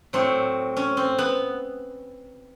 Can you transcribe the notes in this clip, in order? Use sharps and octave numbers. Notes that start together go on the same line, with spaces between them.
A2 F#3 C4
C#4
C4
B3